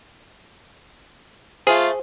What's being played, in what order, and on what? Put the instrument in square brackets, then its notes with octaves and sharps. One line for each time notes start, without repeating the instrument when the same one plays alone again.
[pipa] A3 G#5 [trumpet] F4 [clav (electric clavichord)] G#4 [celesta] C5